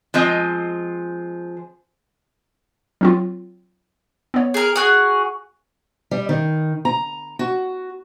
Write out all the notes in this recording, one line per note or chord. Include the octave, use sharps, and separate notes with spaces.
F3 G#3 C4 D#5
F#3 C4 F4
B3 C#5
G#4 A#4
F#4 G#4
G3
D#3
A#5
F#4